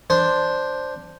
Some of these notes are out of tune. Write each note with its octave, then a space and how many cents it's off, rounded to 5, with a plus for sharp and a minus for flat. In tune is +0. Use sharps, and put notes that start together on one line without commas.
D4 +0 C5 +0